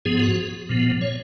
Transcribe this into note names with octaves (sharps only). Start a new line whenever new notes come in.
G#2 F3 B3 G#4
F#4
A#2 F3 B3
C#5